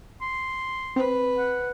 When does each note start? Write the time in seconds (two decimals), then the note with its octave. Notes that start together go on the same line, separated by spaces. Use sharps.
0.21 C6
0.96 C4 B4
1.38 F#5